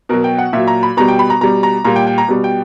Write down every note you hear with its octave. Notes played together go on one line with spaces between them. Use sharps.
B2 F#3 A#4
G5
F#5
A#2 F#3 E5
A#5
B5
B2 G3 A#5
G5
B5
A#5
B2 G3 A#5
A#5
A#2 G3 A#5
G5
G5
A#5
B2 G3
G5